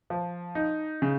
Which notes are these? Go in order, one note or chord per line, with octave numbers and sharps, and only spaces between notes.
F3
D#4
C#3